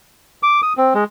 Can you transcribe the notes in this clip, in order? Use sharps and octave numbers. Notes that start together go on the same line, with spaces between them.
D6
D#6
C4
G#3